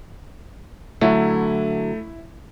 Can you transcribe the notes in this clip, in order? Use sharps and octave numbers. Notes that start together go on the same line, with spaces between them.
D3 F#3 A3 E4